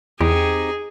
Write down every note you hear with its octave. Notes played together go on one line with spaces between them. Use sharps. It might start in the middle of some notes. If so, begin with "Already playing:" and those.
E2 C4 D#4 G4 G#4